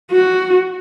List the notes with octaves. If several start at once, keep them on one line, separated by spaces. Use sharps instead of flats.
F#4